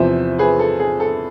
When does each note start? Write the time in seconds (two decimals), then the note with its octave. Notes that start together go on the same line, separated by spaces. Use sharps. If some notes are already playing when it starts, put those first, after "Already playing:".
Already playing: E2 C3 F3 C5 E5
0.38 G#4 B4
0.59 A4
0.80 G#4
1.00 A4